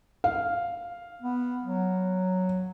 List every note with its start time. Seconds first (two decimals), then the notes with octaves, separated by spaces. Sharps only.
0.24 F5
1.22 B3
1.63 F#3